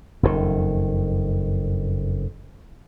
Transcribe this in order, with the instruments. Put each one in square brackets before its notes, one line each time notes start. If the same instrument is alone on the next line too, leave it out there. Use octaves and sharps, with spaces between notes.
[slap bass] F#1 F2 G#2 D#3